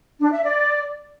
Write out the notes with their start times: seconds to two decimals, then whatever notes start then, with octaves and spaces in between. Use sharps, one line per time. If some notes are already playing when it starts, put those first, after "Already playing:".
0.20 D4
0.32 E5
0.43 D5